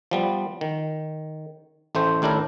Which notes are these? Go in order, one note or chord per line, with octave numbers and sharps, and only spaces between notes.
F3 G3 B3
D#3
A1 A3 C5
D#2 A2 D4 E4 A#4